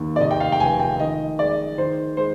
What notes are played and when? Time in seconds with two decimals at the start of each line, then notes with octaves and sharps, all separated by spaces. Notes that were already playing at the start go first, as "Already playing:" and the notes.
Already playing: D#2
0.16 D5
0.21 C3 D#5
0.31 G5
0.40 F5
0.52 G5
0.60 F1 G#5
0.79 G5
0.99 D#3 D#5
1.39 G#3 D5
1.78 D#3 C5
2.17 G#3 C5